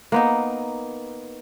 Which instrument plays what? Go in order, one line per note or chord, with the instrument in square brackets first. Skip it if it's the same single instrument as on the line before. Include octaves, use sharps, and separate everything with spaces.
[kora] A#3 B3 D#4